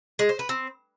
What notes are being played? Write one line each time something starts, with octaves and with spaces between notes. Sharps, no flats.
G#3
C5
B4
C4